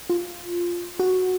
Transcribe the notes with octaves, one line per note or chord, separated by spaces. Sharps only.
F4
F#4